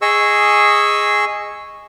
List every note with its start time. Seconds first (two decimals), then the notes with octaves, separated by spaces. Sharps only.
0.02 G#4 D#5 C#6 E6